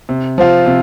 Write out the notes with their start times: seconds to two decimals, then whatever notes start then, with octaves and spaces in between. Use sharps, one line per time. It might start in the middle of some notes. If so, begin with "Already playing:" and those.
0.09 C3
0.38 F3 C4 F4
0.66 C3